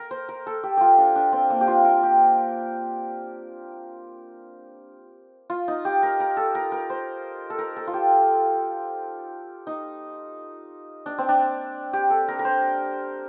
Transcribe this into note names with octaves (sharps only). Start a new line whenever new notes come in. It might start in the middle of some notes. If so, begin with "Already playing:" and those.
Already playing: A#4
C5
A#4
A4
G4
F4 G4
D4
D4
C4
A#3
G4
F4
A#4
G4
F4
D#4
G4
A#4
A#4
A4
A#4
A#4
C5
A4
A#4
A4
F4
G4
D#4
D4
C4
D4
G4
A4
A#4
A#4
C5